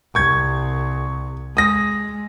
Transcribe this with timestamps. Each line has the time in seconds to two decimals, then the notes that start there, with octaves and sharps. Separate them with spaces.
0.15 C2 C#6 G#6
1.57 G#3 D#6 A#6